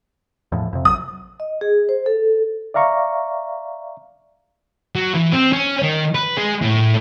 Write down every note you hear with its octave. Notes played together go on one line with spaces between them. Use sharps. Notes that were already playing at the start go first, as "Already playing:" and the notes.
E2 A2 F3
F2 C3
A#1 F#3 D#6
D#5
G#4
C5
A4
D5 E5 F5 A#5 C#6
F#3
E3
C4
C#4
D#3
B4
G#3
A2